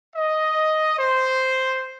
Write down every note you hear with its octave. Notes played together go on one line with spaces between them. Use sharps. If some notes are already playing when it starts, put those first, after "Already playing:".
D#5
C5